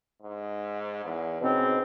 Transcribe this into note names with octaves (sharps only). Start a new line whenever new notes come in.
G#2
E2
G#2 B2 C4 C#4